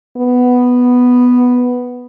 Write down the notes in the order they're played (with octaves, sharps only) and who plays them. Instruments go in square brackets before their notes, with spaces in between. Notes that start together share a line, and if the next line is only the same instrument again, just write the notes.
[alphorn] B3